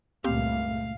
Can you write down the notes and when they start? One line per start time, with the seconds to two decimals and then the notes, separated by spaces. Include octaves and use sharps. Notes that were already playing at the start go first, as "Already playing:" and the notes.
0.24 C#2 G2 A#2 A3 A#3 C4 G4 F5